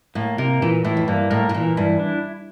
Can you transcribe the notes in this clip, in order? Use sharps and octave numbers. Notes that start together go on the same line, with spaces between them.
A2 A#3
C3 A#4
A#2 E3
A2 E4
F2
G2 A#3
A2 A#4
A2
A#2 E3
G2 E4
D4